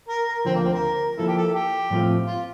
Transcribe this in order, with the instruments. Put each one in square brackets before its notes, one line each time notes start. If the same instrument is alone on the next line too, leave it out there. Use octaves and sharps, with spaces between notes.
[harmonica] A#4
A#4
[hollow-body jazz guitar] D2 D3 F3 [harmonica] C4
[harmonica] A#3
C4
A#4
[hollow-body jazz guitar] F3 A#3 E4 [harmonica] A4
[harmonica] G4
A4
G4
[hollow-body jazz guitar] A2 F3 A3 C4 F4
[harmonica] F4